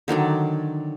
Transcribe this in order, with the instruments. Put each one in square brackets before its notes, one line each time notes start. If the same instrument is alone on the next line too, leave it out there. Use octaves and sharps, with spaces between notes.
[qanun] D3 D#3 F#3 D5